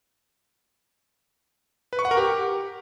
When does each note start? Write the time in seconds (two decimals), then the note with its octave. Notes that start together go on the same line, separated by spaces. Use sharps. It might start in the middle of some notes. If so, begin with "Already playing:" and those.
1.93 B4
1.99 C#6
2.05 F#5
2.11 A#4
2.17 G4